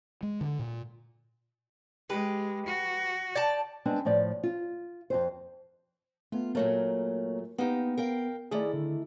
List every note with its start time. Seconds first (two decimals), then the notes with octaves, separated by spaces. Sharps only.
0.23 G#3
0.41 D3
0.59 A#2
2.10 G#3 G4 B4
2.66 F#4
3.35 D5 G5 A5
3.85 G3 G#3 B3 C4 D4
4.05 A2 F3 D5
4.43 F4
5.10 F2 C3 C5
6.32 A3 B3 F4
6.55 A#2 F#3 A3 A#3 A#4 C#5
7.58 A#3 B3 D#4 G4
7.97 A#4 F5 G5
8.51 D#3 A3 E4 G#4 D5
8.74 D3